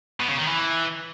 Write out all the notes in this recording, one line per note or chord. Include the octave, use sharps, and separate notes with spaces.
B2
C#3
D#3
E3